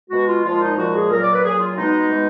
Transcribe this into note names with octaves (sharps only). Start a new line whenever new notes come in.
B2 G#3 F#4
F4
A#2 F3 G#3 F4
D#4
A#2 F3 G#3 F#4
G#4
A#2 F#3 A#4
D5
B4
A#2 F#3 G#4
F4
B2 G#3 D#4
B2 G#3